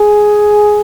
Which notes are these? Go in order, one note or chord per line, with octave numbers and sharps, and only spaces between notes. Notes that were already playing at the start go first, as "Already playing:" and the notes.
Already playing: G#4